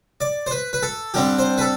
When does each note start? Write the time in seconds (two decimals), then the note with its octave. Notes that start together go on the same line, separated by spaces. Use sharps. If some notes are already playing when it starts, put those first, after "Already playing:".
0.21 D5
0.47 C5
0.51 B4
0.73 B4
0.83 A4
1.14 D3 G3 C4 G4
1.39 C5
1.58 B4
1.61 A4